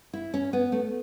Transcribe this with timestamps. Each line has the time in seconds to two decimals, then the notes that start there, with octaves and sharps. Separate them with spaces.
0.13 E4
0.34 C#4
0.53 B3
0.72 A3